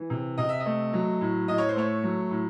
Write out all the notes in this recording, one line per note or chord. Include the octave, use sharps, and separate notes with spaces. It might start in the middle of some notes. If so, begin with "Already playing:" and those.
Already playing: E3
C3
C3 D#5
E5
D#5
A3
F#3
A2
A2 D#5
C#5
C5
A3 C#5
F#3
A2